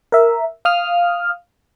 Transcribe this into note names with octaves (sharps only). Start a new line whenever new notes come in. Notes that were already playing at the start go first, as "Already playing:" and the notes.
A#4 E5
F5 D#6 F6